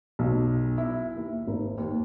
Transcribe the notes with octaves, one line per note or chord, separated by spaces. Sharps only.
B1
E4
D#2
G#1
D#2